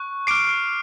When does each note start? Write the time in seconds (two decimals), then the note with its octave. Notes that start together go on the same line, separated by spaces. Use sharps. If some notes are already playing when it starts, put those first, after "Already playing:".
Already playing: C#6 F#6
0.27 D6 F6 C7 D7